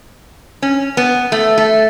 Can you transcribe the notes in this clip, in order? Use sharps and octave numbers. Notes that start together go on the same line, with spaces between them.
C#4
B3
A3
A3